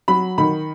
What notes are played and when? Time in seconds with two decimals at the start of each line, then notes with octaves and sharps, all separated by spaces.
0.08 F#3 B5
0.38 D#3 B5